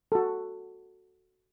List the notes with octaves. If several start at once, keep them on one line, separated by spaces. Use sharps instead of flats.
F#4 A4